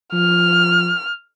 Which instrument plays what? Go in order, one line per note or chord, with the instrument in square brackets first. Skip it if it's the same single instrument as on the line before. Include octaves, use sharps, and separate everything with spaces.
[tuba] F3 [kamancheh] F6